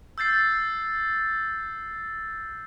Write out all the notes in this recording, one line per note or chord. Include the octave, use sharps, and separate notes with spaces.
E6 G6 A6 C7